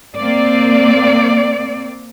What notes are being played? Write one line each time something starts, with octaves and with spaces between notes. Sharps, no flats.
A#3 C4 D5